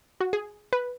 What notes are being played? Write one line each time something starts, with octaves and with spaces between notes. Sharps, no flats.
F#4
G#4
B4